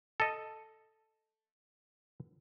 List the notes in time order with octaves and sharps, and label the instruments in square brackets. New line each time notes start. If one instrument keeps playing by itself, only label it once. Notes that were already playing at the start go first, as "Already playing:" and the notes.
[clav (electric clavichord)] A4 D#5